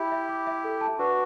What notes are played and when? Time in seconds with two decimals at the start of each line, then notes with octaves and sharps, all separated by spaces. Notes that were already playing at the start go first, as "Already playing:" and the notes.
Already playing: E4 G4 B5
0.12 E5
0.29 D6
0.47 E5
0.64 A4
0.81 A5
0.98 D4 F#4 B4